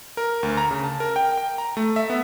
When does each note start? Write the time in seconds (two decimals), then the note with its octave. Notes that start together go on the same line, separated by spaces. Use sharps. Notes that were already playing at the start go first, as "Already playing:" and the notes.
0.17 A#4
0.43 D2
0.57 A#5
0.71 C#3
0.84 A5
1.00 A#4
1.16 G5
1.38 G5
1.58 A#5
1.77 A3
1.96 E5
2.10 B3